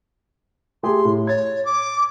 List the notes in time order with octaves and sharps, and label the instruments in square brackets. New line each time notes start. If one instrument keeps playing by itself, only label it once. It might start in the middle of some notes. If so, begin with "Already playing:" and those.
[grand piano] A3 G4 G#4 [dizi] C6
[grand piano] A2
[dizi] C#5 [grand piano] G#6 A6
[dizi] D6